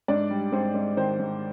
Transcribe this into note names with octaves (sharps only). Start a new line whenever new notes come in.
G#2 D4 D5
G3
G#2 C4 C5
G#2
D#3 C4 C5
G#2